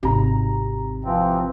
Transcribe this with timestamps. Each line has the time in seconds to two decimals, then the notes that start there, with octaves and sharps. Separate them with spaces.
0.03 G#1 C3 D#4 A#5
1.05 E3 F3 C4